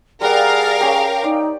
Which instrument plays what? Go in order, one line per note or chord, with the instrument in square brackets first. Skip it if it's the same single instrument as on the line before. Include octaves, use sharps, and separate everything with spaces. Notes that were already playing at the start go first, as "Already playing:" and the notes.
[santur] G3 F#5 [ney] G#4 [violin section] A#4 F5 [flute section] D5 F6
[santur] C#4 G4 [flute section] G5
[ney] D#4 [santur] D5